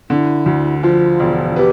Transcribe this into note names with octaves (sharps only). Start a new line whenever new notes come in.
D3 E4
D2
F3 F4
E1
B3 G4